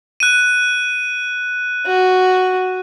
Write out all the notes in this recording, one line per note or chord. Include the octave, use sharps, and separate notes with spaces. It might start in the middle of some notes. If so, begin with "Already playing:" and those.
F#6 D#7
F#4